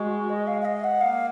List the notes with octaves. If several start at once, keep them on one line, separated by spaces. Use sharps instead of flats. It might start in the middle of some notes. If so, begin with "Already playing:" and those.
Already playing: G#3 F#4
D#5
F5
F5
D#5
F#5
A#3 F5